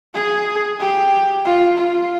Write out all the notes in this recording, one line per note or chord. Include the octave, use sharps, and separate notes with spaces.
G#4
G4
F4
F4